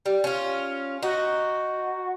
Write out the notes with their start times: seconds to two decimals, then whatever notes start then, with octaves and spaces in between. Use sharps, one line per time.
0.06 G3
0.24 C#4 F4
1.03 D#4 F#4